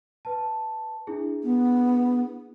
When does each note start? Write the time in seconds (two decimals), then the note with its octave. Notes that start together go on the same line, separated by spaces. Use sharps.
0.25 B4 A5
1.07 D4 E4 G#4
1.44 B3